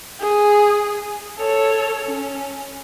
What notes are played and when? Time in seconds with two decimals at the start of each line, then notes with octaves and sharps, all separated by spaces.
0.21 G#4
1.38 A4 C#5
2.05 C#4